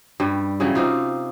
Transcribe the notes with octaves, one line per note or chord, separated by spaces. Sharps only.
G2 G3
C#3 E3 F#3 G3
C3 D#4 F4